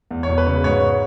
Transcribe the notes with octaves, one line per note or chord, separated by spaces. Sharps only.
E2
C#5
E1
B4
C#3
G#2 C#5